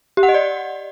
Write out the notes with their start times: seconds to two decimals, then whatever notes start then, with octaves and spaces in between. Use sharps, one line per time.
0.17 G4
0.23 F#5
0.29 D#5
0.34 D5